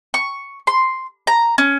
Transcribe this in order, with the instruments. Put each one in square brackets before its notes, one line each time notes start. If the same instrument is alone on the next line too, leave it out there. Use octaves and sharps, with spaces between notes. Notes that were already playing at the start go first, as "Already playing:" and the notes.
[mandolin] C#6
C6
A#5
C#4